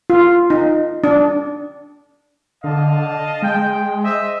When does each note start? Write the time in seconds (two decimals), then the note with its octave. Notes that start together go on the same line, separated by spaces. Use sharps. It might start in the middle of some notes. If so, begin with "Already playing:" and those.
0.10 F4
0.50 D#4
1.04 D4
2.64 D3 D#5 F5 A5
3.42 G#3 G5
4.03 C5 D#5 E5